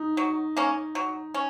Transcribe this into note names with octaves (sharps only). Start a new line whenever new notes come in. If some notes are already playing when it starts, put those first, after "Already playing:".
Already playing: D#4
F#3
A#3 C#4
F#3
C#4